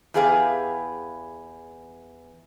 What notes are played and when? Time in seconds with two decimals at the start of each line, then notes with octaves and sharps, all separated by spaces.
0.14 E2 G4 G#4 B4 F5 G#5